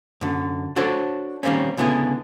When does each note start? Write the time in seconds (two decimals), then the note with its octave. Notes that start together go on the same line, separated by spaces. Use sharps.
0.21 F#2 D3
0.76 D4 F#4 A4 C5 C#5
1.43 D#3 G3 A#3 C4 C#4
1.77 C#2 D3 B3 E4 G#4